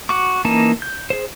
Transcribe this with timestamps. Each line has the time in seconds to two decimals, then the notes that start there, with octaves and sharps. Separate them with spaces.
0.09 F#4 C#6 D6
0.45 E3 A#3 C#4 D#4 A5
0.82 G6
1.10 G#4 C5